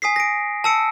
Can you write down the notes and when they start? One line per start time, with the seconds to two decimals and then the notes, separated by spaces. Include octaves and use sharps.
0.02 G#5 D#6 B6 C7
0.16 A#6 D7
0.64 A5 E6 C#7 D7